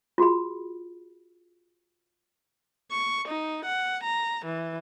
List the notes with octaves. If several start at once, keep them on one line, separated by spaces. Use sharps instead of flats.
F4 F#4 G#4 B5
C#6
D#4
F#5
A#5
E3